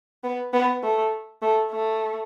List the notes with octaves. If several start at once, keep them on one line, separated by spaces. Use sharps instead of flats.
B3
B3
A3
A3
A3